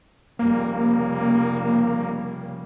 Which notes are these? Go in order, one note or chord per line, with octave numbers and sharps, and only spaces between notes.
F1 C#3 G3 A#3